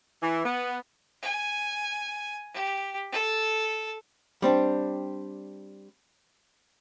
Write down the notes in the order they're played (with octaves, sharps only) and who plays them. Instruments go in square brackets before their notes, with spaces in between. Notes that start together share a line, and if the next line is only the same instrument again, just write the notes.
[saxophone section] E3
B3
[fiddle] G#5
G4
A4
[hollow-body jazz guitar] G3 C4 D4